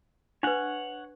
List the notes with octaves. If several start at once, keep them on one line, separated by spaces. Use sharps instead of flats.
D4 B4 C#5 F#5